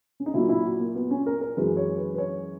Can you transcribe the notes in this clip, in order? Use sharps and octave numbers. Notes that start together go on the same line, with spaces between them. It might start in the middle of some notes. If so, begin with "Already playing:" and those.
C#4
D#4
A#2 F#3 A#3 E4
E4
F#4
A#3
B3
C#4
A#4
A#4
F#2 E3 G#3 B4
C#5
B4
B4
C#5